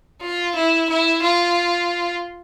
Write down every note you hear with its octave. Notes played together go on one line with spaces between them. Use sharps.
F4
E4
E4
F4